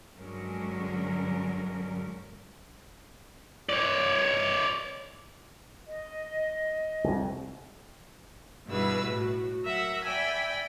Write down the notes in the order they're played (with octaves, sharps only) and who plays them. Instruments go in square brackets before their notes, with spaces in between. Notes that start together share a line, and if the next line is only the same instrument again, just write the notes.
[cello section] G2 D3 F#3 G#3 C#4 A#4
[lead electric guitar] C#5 D5
[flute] D#5
[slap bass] C2 F2
[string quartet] G2 B2 E3 G#4 B4 E6
A2 F#4
F#3 A#4 E5 F#5
D5 E5 G5 G#5 B5